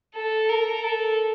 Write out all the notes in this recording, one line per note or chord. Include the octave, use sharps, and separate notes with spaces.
A4
A#4
A4